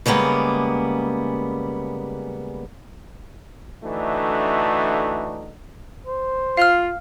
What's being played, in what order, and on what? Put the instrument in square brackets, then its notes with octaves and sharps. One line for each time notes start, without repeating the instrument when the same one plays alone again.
[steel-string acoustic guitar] C#3 G3 G#3 A#3 B3
[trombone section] D3 E3 A3 D4 D#4 F#4
[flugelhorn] C5
[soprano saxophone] F4 [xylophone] F5 F6